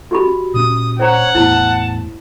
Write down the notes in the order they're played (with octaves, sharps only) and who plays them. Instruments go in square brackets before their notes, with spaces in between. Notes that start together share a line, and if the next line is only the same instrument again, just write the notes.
[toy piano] F#4 G4 B5
[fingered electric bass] A#2 C#4 [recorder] D#6
[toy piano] C5 A#5 [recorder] C#5 [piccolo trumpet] F#5
[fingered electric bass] E2 A2 [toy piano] E4 [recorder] A5